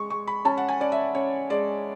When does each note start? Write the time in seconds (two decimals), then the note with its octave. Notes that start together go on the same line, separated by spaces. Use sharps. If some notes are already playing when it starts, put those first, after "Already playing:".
Already playing: G#3 C#6
0.10 G#3 C#6
0.27 B5
0.45 C#4 A5
0.57 F#5
0.69 G#5
0.80 C#4 D5
0.92 E5
1.15 C#4 C#5
1.50 G#3 D5